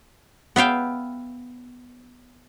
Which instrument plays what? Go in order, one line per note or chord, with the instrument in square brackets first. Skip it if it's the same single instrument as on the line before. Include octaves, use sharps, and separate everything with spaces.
[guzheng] B3 E5 F5 G5